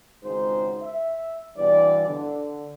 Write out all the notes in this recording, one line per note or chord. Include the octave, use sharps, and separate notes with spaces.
G#1 C#2 G#2 D#4 C5
E5
G2 B2 E3 D5
D3